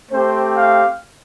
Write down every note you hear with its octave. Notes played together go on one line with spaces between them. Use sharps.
A3 C4 G4 C5
F5